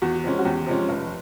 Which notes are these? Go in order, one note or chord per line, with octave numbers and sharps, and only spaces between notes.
E2 F#4
C3 F3 G#3 C#4
F#4
E2 G4
C3 F3 G#3 C#4
F1